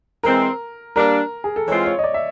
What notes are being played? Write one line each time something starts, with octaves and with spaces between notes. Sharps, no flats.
E3 G#3 C4 A#4
G3 A#3 D4 A#4
G#4
A4
E3 G#3 C4 F4 C#5
C#5
D#5
D5
E5